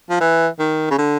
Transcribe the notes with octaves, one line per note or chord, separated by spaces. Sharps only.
F3
E3
D#3
C#3
D3